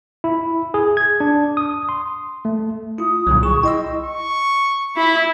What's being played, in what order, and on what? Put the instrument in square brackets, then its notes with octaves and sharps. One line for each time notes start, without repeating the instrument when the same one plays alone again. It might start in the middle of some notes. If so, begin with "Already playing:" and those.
[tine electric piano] E4
G#4
G#6
D4
D#6
C6
A3
[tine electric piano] E4 F4 [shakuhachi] D#6
[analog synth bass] C2 [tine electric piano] A#2 D3 F#3
[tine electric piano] G#4 [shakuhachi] C#6
[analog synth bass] E4 [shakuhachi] D#5 [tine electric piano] G5 C6 E6
[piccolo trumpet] C#6
[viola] E4 [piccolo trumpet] B5